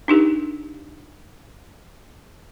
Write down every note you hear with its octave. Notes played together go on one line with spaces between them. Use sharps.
D4 D#4 G4 A#4